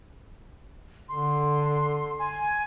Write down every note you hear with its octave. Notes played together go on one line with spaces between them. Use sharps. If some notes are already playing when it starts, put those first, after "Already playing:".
D3 C6
G#5